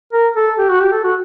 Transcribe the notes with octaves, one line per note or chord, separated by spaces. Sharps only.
A#4
A4
G4
F#4
G4
A4
F#4